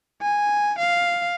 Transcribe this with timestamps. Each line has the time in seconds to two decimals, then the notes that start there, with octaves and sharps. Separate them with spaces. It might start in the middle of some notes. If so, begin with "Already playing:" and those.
0.22 G#5
0.79 F5